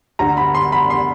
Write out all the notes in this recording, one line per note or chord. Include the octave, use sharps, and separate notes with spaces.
D2 D3 A#5
B5
C6
B5
C6